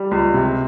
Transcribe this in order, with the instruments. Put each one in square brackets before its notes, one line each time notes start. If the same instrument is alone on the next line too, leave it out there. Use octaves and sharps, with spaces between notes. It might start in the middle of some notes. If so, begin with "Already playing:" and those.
Already playing: [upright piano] G3
C#2
C3